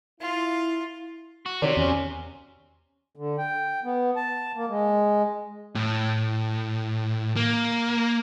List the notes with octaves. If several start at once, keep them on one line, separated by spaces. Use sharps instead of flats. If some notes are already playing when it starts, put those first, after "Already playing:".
E4 F4
F#4
C3 D#3 F#4 C#5 D5
E2 C#4
D3
G5
B3
A5
A#3
G#3
A2
A#3